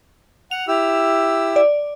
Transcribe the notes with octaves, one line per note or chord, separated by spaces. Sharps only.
F#5 F7
E4 G4 E6
D5